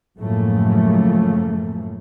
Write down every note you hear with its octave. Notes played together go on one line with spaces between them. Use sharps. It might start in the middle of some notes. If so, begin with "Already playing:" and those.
F#2 A2 C#3 F3 A3 A#3